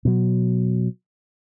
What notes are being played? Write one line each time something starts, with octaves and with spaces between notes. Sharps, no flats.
B2 F#3